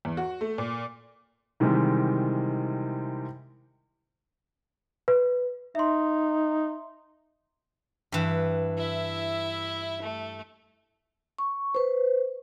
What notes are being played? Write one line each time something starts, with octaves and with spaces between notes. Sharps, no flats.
E2
F#4
A3
A#2
C3 D#3 E3 G3 G#3
B4
D#4 E5 C6
G2 E3
E4 E5
A3
C#6
B4 C5